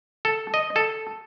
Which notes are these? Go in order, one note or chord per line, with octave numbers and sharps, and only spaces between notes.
A4
D#5
A4